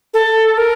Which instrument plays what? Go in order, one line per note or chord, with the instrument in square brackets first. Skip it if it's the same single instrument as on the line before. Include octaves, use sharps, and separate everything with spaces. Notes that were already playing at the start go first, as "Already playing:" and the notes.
[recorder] A4
A#4